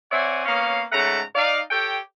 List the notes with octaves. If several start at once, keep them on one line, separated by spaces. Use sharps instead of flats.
C4 C#5 D5 E5 F#5 G#5
A#3 B3 C#4 C#5 F5
G#2 C#3 A3 F#5 A5 A#5
D#4 D5 F5
G4 A4 C#5 G5